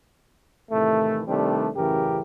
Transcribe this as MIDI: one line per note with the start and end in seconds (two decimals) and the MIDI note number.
0.70 1.21 45
0.70 1.21 48
0.70 1.21 51
0.70 1.21 52
0.70 1.21 57
1.27 1.68 48
1.27 1.68 51
1.27 1.68 55
1.27 1.68 57
1.27 1.68 60
1.27 1.68 62
1.76 2.20 33
1.76 2.20 42
1.76 2.20 49
1.76 2.20 52
1.76 2.20 67
1.76 2.20 70